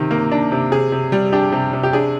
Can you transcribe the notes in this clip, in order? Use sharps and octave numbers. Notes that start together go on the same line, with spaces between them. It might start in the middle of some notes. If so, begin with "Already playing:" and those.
Already playing: C3 D#3
A#3
D4
C3
C3 G#4
C3
G3
D4 G4
C3
C3
G4
D4 G#4